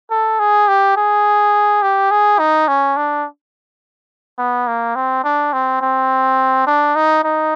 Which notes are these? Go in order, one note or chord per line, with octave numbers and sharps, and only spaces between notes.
A4
G#4
G4
G#4
G4
G#4
D#4
C#4
D4
B3
A#3
C4
D4
C4
C4
D4
D#4
D#4